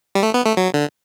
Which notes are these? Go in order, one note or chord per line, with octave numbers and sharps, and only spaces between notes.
G3
A3
B3
A3
F#3
D3